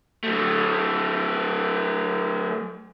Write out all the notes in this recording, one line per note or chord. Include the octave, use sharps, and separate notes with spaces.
F#3 A3